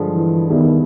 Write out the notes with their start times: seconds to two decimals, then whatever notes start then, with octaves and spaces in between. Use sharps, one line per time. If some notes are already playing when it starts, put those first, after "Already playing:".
Already playing: G2 D3 F3 G#3
0.14 E3
0.50 E2 B2 D#3 G3 B3 E4